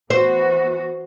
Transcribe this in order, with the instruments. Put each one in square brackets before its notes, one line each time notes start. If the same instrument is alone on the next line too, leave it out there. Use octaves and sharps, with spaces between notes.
[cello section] E3 B3 F#4 [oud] C5